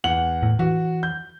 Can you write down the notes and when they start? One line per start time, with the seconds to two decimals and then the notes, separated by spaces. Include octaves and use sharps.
0.04 E2 F#5 F#7
0.43 A2
0.59 E3 F#4
1.03 G6